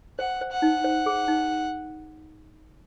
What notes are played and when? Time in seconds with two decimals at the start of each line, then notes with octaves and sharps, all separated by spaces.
0.19 C5 F#5
0.41 C5
0.52 F#5
0.62 D#4
0.84 C5
1.06 G#4
1.28 D#4